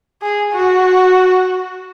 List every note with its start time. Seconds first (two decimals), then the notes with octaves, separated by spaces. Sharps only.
0.22 G#4
0.53 F#4